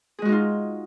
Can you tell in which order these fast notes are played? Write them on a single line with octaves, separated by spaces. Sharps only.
G#4 G#3 F#4 D#4 F4